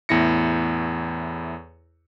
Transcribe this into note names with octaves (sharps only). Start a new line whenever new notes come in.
E2 A2 E4 A#6 C#7